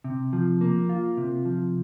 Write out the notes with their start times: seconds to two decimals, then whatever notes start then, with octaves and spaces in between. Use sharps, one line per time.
0.04 C3
0.33 F3
0.61 A#3
0.89 F4
1.17 C3
1.45 F3